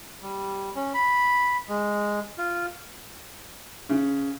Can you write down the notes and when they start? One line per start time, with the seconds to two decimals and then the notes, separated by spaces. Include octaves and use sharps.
0.22 G3
0.75 C#4
0.94 B5
1.69 G#3
2.38 F4
3.89 C#3